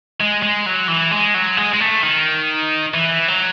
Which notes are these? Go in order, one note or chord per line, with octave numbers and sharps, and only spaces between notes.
G#3
G#3
F#3
E3
G#3
F#3
G#3
G#3
A3
D#3
E3
F#3